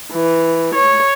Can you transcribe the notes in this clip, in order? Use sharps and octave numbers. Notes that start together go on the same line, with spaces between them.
E3
C#5